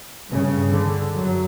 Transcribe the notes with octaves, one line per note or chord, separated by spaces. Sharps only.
G2 C#3
D3
F#2 F#3